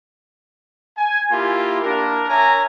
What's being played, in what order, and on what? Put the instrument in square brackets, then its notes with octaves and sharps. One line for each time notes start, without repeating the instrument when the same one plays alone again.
[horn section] G#5
A#3 E4 F4 G4
A#3 D4 A#4
C#5 E5 G#5 A#5